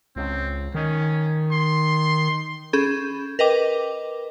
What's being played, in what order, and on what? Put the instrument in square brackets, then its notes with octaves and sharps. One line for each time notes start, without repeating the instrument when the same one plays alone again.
[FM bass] C#2 [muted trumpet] C4
[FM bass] D#3 [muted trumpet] C#4
[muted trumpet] C6
[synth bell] C#4 G#4 A4 B5 G6
A#4 B4 D#5 G5 D6